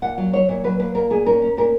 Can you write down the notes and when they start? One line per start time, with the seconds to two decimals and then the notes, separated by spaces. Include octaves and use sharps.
0.02 A#2 F#5
0.18 F#3
0.33 F#3 C#5
0.49 A#2 C#5
0.64 F#3 B4
0.80 A#3 B4
0.95 A#2 A#4
1.10 A#2 G#4
1.26 C#4 A#4
1.42 C#4
1.57 A#2 A#4